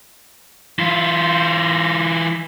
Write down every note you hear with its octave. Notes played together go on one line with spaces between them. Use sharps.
E3 F4